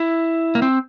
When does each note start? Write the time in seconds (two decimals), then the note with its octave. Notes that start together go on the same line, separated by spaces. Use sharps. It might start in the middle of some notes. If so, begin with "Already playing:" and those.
Already playing: E4
0.55 A#3
0.62 C4